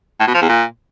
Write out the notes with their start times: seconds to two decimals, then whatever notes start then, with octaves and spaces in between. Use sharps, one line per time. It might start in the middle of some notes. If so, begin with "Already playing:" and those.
0.20 A2
0.27 B2
0.34 F3
0.42 E2
0.49 A#2